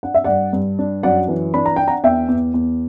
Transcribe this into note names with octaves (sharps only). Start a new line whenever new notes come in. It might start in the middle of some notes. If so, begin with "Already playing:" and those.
D4 F#5
E5
G2 D5 F#5
G2
D4
F#2 D5 F#5
E3
D4 B5
A#5
D4 G5
F#5 A#5
E2 E5 G5
E2
E2